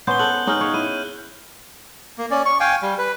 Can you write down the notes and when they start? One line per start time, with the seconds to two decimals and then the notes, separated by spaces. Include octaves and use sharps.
0.07 B3 C#4 C5 G6 G7
0.19 A4 F#6 F#7 G7
0.47 C#4 D#4 G#4 F6 F#7 G7
0.61 C#5 F5
0.74 E4 D#7
2.18 A#3
2.31 C#4 D5
2.46 C#6
2.60 F5 G5 G#5
2.82 G3
2.98 B4